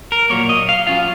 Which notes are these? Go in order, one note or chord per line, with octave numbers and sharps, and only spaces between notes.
A#4
A#2 F#3 A#3 C#5
D#5
F5
F#3 C#4 F4 F5